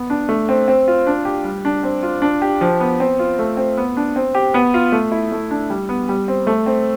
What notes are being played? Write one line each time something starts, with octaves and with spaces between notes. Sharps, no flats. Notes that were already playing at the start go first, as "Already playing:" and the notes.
Already playing: B3
D4
A3
C4
C4
F4
D4
G4
G3
D4
C4
F4
D4
G4
F3
B3
C4
F4
A3
C4
B3
D4
C4
G4
B3
F4
A3
E4
A3
D4
G3
B3
G3
C4
A3
C4